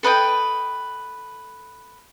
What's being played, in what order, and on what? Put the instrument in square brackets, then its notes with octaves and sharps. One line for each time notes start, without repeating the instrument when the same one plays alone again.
[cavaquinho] A4 B4 D#5 G5